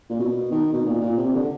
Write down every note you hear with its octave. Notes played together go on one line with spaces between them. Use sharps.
A#2
B2
D#3
B2
A#2
A#2
C3
D3